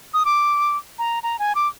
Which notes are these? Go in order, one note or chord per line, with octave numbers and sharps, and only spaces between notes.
D#6
D6
A#5
A#5
G#5
D6